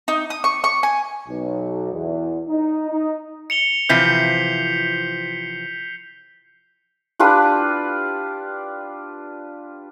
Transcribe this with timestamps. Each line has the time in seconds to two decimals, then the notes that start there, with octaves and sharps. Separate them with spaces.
0.08 D#4
0.30 D#6
0.44 C#6
0.64 C#6
0.83 G#5
1.27 B1
1.92 E2
2.49 D#4
2.90 D#4
3.50 C#7 F7 G7
3.89 C3 E3 F3 G6 B6 C7
7.19 D4 F4 G4 B4